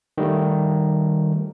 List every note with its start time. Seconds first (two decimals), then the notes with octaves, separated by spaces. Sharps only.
0.18 D#3 G3 A3